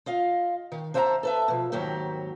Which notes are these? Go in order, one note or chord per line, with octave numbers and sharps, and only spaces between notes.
F4 D#5 F5
D#3
D4 C5 E5 F#5 G#5 A#5
A4 B4 E5
B2 F3
D#2 G#2 D#3 F#3 F#4 G4